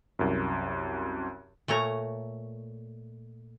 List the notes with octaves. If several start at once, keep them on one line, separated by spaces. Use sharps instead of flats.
C2 F#2
A#2 A3 C#5 A#5